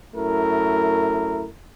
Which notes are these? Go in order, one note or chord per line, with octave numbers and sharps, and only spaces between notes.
F#2 A3 E4 A#4